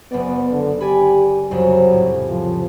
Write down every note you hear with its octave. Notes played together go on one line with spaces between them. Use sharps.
F#1 B3 D5
D3
G4 D5 G#5 B5
C2 F2 C#3 F#3
A2
F3